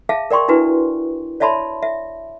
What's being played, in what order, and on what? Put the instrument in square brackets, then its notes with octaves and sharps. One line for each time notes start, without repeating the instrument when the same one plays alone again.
[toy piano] G#4 E5 F5 A5
A#4 D5 G5 C6 C#6
D4 E4 F#4 B4
C#5 D5 E5 A5 B5 C6
E5